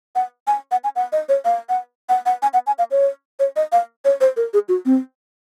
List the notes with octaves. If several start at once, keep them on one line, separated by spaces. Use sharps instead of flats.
F#5
G#5
F#5
G#5
F#5
D#5
C#5
F5
F#5
F#5
F#5
G#5
F#5
G#5
F5
C#5
C#5
D#5
F5
C#5
C5
A#4
G#4
F#4
C4